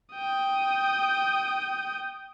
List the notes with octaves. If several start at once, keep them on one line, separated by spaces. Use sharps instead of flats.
G5 D#6